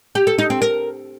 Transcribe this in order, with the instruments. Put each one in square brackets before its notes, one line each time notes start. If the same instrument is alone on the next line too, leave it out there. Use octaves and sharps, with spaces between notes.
[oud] G4
A4
D#4
C4
A#4